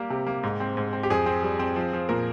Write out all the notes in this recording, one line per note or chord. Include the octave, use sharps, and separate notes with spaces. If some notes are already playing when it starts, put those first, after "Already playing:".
Already playing: G3 A#3 G4
C3
A#3
G#2
C4
G#2
C4
G4
F2 G#4
C4
G3
C4
F3
F3
A#2 A#4